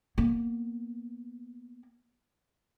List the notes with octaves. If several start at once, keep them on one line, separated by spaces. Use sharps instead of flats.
A#3 B3